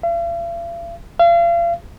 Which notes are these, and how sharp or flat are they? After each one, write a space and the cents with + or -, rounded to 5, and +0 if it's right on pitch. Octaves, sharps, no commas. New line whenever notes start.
F5 -45
F5 -35